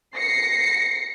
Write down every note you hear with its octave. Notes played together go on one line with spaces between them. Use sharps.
A#6 C7 C#7